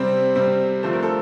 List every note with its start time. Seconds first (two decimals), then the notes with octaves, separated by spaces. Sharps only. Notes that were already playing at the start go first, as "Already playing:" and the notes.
Already playing: C3 G3 C4 C5
0.35 C3 G3 C4
0.83 D3 F3 A3 C5
0.93 A#4
1.03 A4